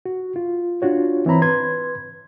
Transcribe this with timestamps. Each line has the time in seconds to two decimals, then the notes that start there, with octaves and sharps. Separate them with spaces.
0.06 F#4
0.36 F4
0.82 D4 F4 F#4 C#5
1.26 E3 C4 C#5 A#5 B5
1.42 B4 C6 G#6